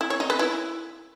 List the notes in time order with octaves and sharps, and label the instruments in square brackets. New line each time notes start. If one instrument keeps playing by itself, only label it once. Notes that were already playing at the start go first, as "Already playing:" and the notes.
[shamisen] E4
C#5
D#4
B4
E4